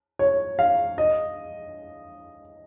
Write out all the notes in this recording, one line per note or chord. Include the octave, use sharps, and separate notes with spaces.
C#5
F5
D#5